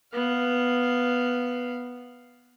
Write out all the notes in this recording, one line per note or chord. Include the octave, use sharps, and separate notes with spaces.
B3 F5